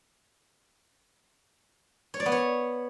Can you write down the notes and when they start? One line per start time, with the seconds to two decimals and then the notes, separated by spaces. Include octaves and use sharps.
2.14 C#5
2.20 D5
2.26 B3
2.32 C#5